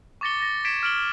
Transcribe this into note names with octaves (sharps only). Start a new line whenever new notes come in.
C#6 D6 A6 A#6 C#7 G7
A6 A#6
G#6 A#6 B6 C#7 D7 E7
F6 D7 F#7 G7